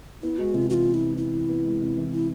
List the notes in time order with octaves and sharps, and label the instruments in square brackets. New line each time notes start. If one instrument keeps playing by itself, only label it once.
[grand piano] B3 [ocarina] E4
[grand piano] G#3 [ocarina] F#4
[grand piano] C3 [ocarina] F4
[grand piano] E3 [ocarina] F#4
[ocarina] F4
[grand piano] B3
[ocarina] E4
[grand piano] G#3
[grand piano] C3 [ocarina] E4
[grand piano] E3
B3
G#3
C3
E3
[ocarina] E4